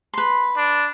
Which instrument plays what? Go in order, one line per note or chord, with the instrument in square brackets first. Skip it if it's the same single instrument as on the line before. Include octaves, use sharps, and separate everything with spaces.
[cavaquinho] B4 C6
[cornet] D4